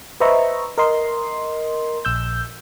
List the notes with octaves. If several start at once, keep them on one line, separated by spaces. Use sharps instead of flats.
B4 C5 D#5 E5 A#5 C#6
A#4 D#5 C6
A#1 E6 G6